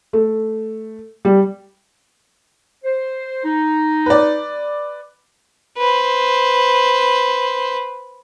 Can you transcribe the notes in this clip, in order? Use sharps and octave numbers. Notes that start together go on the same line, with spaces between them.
A3
G3
C5
D#4
B4 D5
B4 C5